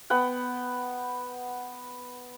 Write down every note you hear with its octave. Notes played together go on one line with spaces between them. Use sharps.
B3 F#5 G5